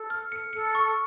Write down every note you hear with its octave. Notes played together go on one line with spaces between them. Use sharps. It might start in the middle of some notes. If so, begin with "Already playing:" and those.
Already playing: A4
F6
C#7
A4 C#7
C#6